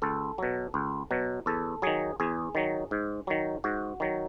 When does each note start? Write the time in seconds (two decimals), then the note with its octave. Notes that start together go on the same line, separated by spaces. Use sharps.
0.02 C#2 A4
0.38 B2 F#3
0.74 C#2
1.11 B2 F#3
1.46 E2 A4
1.82 D#3 F#3 G#4
2.20 E2 G#4
2.55 D#3 F#3
2.91 G#2
3.27 D#3 F#3
3.64 G#2 F#4
4.00 D#3 F#3